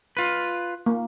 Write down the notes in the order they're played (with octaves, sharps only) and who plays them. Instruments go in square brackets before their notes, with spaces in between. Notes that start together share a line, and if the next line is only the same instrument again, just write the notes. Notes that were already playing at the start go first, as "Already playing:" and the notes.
[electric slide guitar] F4 B4
[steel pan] A#3